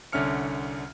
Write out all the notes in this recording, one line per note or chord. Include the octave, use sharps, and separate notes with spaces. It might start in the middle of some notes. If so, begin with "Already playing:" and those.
C2 D3 C#4 E5 F6 C#7